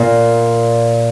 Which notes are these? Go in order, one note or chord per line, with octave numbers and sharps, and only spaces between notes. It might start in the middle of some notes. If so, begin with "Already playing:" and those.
Already playing: A#2